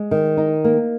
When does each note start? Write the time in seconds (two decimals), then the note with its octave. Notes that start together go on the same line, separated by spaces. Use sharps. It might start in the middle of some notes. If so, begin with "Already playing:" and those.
Already playing: G#3
0.11 D#3
0.37 D#4
0.64 A#3